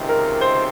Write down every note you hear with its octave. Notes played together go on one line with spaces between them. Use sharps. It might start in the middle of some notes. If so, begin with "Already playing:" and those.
Already playing: C#2 C3 D#3
A#4
C5